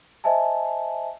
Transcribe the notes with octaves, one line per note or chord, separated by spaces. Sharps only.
C5 D#5 E5 G#5 A5